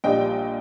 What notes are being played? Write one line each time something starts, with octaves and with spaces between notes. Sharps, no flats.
A#1 A#2 G3 D4 D#5 G5